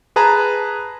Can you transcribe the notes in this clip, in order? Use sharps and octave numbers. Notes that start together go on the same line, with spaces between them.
G#4 B4 A5 A#5